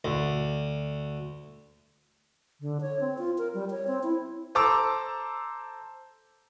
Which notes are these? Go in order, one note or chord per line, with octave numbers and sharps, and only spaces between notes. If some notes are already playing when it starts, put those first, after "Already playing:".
D2
D3
C#5
C4
F4
A#4
G3
C#5
C4
E4
A4 C5 A5 A#5 D6 E6